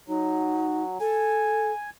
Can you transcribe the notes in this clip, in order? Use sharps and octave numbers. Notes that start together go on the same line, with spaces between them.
F#3 D#4
A4 G#5